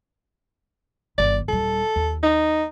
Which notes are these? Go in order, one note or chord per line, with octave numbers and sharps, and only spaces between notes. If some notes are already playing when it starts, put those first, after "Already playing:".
G1 D#3 D5
D#1 G3 A4
D#2
D#4